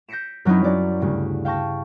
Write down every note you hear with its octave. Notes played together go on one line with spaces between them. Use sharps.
G6 A#6 B6 C#7 D7 E7
F#2 F#3 C4 D#4 E4
F#3 C#4 D5
D2 G2 C#3 D7
F5 G5 A5 C#6 A#6